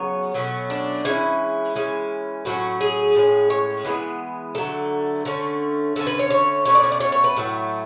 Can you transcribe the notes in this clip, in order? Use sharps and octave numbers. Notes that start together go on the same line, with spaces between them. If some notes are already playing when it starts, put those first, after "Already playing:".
Already playing: C#3 F#3 B3 C#5
B2 F#3 A3 C#4
D4
E3 G#3 C#4 E4
E3 G#3 C#4
A2 F#3 C#4 F#4
G#4
A2 G#3 C#4
C#5
E3 G#3 B3
D3 F#3 A3 A4
D3 A3 C#4
D3 A3 C#4 A4
B4
C#5
C#5
B2 A3 C#4 C#5
D5
C#5
D5
C#5
C#5
B4
A2 F#3 A3